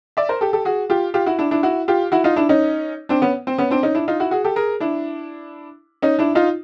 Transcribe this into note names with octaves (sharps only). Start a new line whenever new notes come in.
D5 E5
A#4 C5
G4 A4
G4 A4
F#4 G#4
F4 G4
F4 G4
E4 F#4
D4 E4
D4 E4
E4 F#4
F4 G4
E4 F#4
D#4 F4
D4 E4
C#4 D#4
C4 D4
B3 C#4
C4
B3 C#4
C4 D4
C#4 D#4
D4 E4
D#4 F4
E4 F#4
F#4 G#4
G4 A4
G#4 A#4
D4 E4
C#4 D#4
D4 E4
D#4 F4